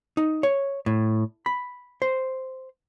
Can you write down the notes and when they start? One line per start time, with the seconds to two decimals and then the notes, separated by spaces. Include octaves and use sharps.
0.17 D#4
0.43 C#5
0.86 A2
1.46 B5
2.02 C5